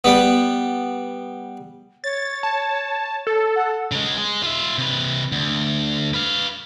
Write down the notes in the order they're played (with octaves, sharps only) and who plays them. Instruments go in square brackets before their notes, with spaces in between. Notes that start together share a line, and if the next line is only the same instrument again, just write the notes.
[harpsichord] G3 B3
[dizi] C#5 [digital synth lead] A6
[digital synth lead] A5
A4
[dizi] F#5
[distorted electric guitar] C#3 G#3
G#3
F4 E5
C3 B4
D2
B4 F5